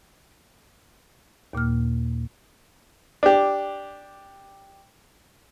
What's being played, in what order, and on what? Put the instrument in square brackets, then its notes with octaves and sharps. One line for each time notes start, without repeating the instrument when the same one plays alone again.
[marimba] D#2 A#2 A#3 F6
[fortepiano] D4 G4